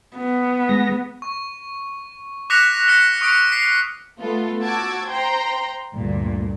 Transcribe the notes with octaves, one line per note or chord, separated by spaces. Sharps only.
B3
G#3 A#6
C#6
D6 F#6 A#6 B6 C#7 F7
F6 A#6 C#7 F7
C#6 D#6 C#7 D7
B6 C7
A3 B3 F4 A4
F#4 A5 D6 E6 G#6
C5 G5 A#5 C6
D2 G2 A#2